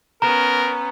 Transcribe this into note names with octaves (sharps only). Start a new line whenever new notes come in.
B3 C#4 A#4 A#5